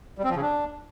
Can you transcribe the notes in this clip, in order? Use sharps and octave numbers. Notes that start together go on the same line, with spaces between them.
G3
C4
F3
C#3
D4